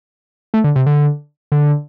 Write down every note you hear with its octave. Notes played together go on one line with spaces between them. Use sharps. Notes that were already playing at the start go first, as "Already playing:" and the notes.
A3
D3
C3
D3
D3